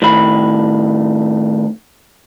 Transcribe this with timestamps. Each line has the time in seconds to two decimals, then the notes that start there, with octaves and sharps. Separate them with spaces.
0.02 A2 D#3 B5